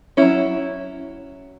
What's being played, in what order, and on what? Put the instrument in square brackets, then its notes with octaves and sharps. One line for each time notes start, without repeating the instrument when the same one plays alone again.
[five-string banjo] F#3 C#4 E4